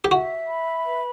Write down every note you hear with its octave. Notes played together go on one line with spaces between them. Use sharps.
G4
F#4 E5
B5
B4